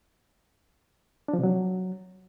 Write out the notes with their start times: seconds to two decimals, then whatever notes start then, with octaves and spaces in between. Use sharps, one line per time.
1.28 D4
1.33 F3
1.38 C3
1.43 F#3